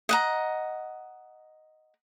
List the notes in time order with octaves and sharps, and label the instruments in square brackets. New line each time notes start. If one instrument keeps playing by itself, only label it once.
[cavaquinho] D#5 F#5 A#5